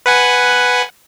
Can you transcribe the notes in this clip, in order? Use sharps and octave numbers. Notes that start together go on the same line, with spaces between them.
B4 F#5 G#5